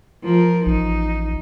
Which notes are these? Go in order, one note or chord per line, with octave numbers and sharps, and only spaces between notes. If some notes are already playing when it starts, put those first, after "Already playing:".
F3 A#4
A1 D#4